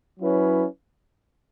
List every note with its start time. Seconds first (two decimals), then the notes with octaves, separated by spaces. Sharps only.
0.19 F#3 C#4 E4 B4